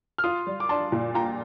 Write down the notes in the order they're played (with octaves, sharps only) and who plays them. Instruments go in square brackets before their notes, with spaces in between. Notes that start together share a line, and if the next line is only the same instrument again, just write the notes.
[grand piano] F6
[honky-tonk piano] F4 [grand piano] C6 D#6
[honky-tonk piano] G3
[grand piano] D6
[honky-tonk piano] D4 [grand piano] A5 C6
[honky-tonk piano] A#2
[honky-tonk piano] F4 [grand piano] G5 A#5